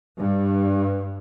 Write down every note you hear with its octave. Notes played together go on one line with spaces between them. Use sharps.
G2